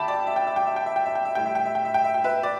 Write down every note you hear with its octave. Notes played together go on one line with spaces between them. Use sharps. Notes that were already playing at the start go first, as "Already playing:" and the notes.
Already playing: D2 D3 G3 E5 G5 A5 B5 D6
D5
E5
G5
E5
G5
E5
G5
E5
G5
E5
G5
E5
A2 G3 G5
E5
G5
E5
G5
E5
G5
E5
G5
B4 E5
D5